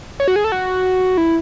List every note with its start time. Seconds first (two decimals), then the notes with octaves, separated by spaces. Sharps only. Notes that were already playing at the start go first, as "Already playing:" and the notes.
0.20 C#5
0.28 F#4
0.36 G#4
0.44 A4
0.52 F#4
1.18 E4